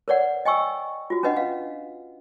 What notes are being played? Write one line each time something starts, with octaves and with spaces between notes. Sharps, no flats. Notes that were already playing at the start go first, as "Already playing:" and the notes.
A#4 B4 C#5 D5 F#5
D#5 G5 G#5 C#6 E6
F4 F#4
C#4 D4 B4 D#5 F#5
F5